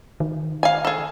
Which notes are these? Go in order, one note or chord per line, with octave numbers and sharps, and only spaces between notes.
D#3
F5 G#5
G#4 A4